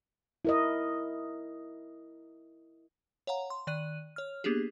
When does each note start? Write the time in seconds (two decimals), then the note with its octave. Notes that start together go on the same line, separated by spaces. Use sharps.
0.45 E4 A#4 D#5
3.27 C#5 F5 F#5 A#5
3.50 C6
3.67 D#3 D5 F#6 D#7
4.16 C#5 F6
4.44 A#3 B3 D4 G4 G#4